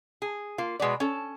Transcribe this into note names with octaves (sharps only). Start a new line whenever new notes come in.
G#4
A#3 F4
B2 G#3 B3 D5
C#4 A4